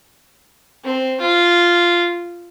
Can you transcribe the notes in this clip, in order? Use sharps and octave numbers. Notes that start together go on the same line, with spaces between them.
C4
F4